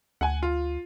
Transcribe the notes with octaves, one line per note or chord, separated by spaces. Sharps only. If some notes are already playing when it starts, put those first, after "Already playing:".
D2 F#5 G#5
F4